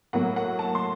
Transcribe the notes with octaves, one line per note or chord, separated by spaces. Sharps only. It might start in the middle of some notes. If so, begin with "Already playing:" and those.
A2 F#3 A#3 F#5
F#5
A5
C6